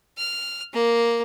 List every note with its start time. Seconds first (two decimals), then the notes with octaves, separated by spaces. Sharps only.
0.18 F6
0.74 A#3